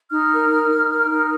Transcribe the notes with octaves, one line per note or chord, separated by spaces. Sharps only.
D#4 F6
A#4
D#4
D#4
A#4
D#4